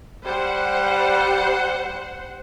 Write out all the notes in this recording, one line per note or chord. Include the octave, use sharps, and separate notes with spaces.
G3 C5 F#5